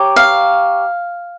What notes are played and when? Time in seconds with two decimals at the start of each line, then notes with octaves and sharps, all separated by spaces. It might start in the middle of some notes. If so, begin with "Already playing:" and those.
Already playing: G4 A#4 C#5
0.16 F5